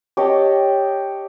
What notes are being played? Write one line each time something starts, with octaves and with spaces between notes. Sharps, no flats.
G4 C#5 D#5 A5